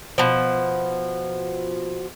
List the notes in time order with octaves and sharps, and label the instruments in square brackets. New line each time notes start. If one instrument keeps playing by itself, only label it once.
[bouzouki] B2 F3